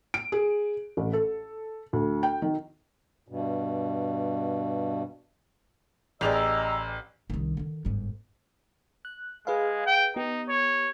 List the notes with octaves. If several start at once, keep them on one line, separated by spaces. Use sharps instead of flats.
D7
G#4
A1
A4
D2
G5
D#3
G2 B2
A1 G4 G#4 D5 D#5 A#5 E6 F7
C2 D#3
D3 D#3
G1 G#2
F#6
G#3 G#4 B4 F5
G5
B3 D#4 G4
C#5